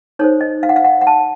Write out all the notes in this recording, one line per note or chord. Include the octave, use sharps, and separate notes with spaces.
D#4 A4 C5 C#5
D#5
F5
F#5
F5
F#5
F#5
A5